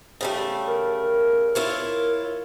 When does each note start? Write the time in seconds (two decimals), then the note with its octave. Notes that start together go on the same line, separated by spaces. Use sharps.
0.21 C#3 G3 A3
0.67 A#4
1.55 E4 F4 C#5